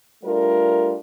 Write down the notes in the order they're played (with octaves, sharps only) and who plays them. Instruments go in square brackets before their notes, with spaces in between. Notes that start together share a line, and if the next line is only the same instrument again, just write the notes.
[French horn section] G3 A3 D4 F4 A#4